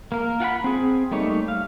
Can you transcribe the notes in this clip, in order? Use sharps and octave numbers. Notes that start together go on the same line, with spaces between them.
A#3 A#4
F4 F#5 G#5 B5
C4 G#4
G3 A3 A#3 D#4 C#5
F5